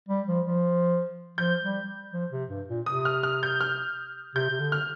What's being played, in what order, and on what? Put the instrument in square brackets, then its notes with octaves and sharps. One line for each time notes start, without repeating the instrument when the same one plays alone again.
[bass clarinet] G3
F3
F3
[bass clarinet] F3 [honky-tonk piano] G6
[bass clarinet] G3
F3
C3
G2
A#2
[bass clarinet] C3 [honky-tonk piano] D#6
[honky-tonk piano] F6
F6
G6
F6
[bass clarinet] C3 [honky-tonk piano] G6
[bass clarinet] C3
D3
[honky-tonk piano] F6